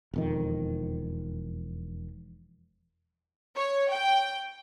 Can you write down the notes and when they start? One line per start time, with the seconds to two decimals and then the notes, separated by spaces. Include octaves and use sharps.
0.14 E1 F2 D#3
3.57 C#5
3.92 G5